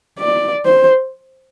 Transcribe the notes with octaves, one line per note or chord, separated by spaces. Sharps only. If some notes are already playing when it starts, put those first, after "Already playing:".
D5
C5